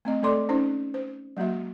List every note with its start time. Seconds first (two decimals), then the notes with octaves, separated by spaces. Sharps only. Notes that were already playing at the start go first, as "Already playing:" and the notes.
0.05 A3 C4 D#5
0.22 G#3 A3 A4 D5 C6 D6
0.49 C#4 D#4 C5
0.94 C5
1.37 F#3 G#3 A#3 F#4 E5